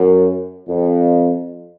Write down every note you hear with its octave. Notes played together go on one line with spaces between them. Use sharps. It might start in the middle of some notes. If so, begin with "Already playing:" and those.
Already playing: F#2
F2